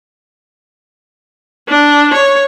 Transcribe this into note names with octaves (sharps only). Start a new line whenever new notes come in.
D4
C#5